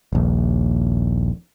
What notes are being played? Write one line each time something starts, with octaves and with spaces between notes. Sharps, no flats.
D#1 A#1